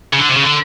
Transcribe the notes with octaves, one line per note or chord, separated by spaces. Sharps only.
C#3
D3
C3
C#3
D3